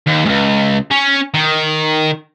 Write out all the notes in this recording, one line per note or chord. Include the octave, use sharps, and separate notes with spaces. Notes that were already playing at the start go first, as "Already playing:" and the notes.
D#2
C#2 G#2
C#4
D#3